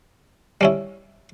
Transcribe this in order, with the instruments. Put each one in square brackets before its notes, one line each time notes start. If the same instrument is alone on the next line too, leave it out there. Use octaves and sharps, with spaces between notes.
[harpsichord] G3 C#4 E4